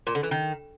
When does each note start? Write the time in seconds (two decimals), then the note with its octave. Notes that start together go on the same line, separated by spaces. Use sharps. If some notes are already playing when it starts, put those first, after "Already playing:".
0.07 A#2
0.15 D3
0.23 E3
0.31 D#3